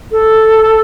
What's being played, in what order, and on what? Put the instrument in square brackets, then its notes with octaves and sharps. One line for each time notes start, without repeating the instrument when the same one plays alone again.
[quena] A4